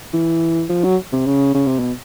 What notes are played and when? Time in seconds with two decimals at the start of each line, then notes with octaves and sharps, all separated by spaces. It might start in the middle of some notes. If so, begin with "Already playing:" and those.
0.14 E3
0.69 F3
0.84 F#3
1.13 C3
1.26 C#3
1.55 C#3
1.67 C3
1.79 B2